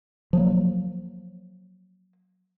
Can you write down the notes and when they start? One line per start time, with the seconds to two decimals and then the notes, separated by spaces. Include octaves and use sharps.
0.33 F3 F#3 A#3